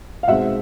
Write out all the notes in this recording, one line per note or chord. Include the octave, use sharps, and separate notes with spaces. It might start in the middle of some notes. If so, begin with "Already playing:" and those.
F5
B2 G#3 C4 D#4 E5 F#5